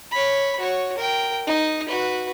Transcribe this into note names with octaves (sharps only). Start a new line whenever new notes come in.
C#5 B5
F#4 C#5
A#4 G5
D#4
F#4 B4